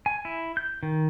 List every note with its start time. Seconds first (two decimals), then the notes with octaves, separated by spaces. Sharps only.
0.06 G#5
0.25 E4
0.57 G6
0.83 D#3